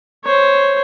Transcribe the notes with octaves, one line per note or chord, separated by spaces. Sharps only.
C5 C#5